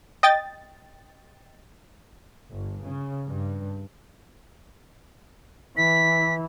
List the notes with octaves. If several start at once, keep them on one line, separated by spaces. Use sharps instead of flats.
D#5 G5 A6
G1
C#3
G2
E3 B6